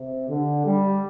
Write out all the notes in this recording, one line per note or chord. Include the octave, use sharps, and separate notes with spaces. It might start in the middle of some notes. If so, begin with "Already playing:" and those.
Already playing: C3
D3
G3